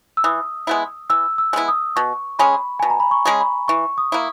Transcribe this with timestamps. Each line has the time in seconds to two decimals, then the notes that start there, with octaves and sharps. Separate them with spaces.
0.17 E6
0.24 E3 D#6
0.67 G#3 B3 E4
1.10 E3 E6
1.38 E6
1.53 G#3 B3 E4
1.68 D#6
1.96 B2 C#6
2.39 G#3 C#4 G#4 B5
2.80 B2 G#5
2.90 A#5
3.00 B5
3.11 C#6
3.25 G#3 C#4 G#4
3.40 B5
3.68 E3 C#6
3.98 D#6
4.12 A#3 E4